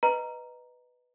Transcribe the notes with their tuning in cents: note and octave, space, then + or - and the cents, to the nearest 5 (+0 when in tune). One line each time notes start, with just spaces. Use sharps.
B4 +0 D#5 -5 A#5 +0